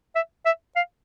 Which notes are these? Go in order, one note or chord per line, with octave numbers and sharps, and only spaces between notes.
E5
E5
F5